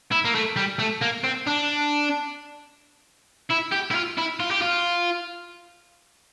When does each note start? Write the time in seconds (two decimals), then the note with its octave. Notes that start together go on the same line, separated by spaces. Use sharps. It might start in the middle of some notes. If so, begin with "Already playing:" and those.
0.12 E4
0.25 A#3
0.35 A3
0.56 G3
0.80 A3
1.02 A#3
1.24 C4
1.47 D4
3.50 E4
3.72 G4
3.91 E4
3.95 F4
4.18 E4
4.40 F4
4.51 G4
4.61 F4